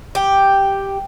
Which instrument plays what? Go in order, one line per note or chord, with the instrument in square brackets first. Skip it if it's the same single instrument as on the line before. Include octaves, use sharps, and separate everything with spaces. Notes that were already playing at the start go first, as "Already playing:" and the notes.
[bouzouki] G4